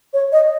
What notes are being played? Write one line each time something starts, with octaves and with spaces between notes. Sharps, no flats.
C#5
D#5